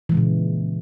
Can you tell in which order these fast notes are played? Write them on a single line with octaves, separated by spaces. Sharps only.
E3 G#3 C#3 A#2